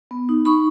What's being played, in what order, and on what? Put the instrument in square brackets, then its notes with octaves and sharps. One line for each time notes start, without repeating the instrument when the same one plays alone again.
[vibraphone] B3
D#4
D#4 B5 C#6